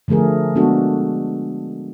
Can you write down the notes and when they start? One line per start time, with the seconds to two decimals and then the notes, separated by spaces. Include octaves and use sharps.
0.08 D3 F3 A3 G#4 A#4
0.55 G#3 B3 D4 F#4 A4